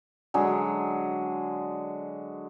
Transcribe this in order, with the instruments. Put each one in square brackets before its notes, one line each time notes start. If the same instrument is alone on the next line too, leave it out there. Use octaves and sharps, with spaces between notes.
[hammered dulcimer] D3 F#3 G#3 G#4